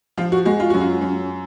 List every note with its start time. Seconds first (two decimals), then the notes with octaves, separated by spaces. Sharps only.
0.17 F3 F4
0.32 F#4
0.45 G#3 F#4
0.60 F4
0.70 F#2 F#4
0.81 F4
1.01 F#2